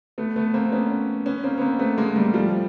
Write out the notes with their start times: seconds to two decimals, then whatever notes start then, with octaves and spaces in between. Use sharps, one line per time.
0.18 A3 B3
0.36 A3 B3
0.54 A#3 C4
0.72 B3 C#4
1.26 B3 C#4
1.44 A#3 C4
1.58 B3
1.61 A#3 C4
1.79 A3 B3
1.98 G#3 A#3
2.16 G3 A3
2.34 F3 G3